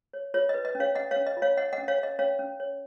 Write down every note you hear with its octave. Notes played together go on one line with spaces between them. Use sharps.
C#5
F4 C#5
D#5
B4
D#5
C#4
C#5 F5
C#4 D#5 F#5
C#5 F5
C#4
D#5
F4
C#5 F5
C#5 D#5 F#5
D#5 F#5
C#4
C#5 F5
C#5 D#5
C#4 C#5 F5
C#4
C#5